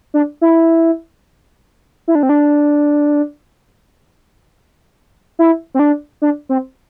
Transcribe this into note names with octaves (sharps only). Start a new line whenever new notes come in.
D4
E4
E4
D4
C4
D4
E4
C4
D4
D4
C4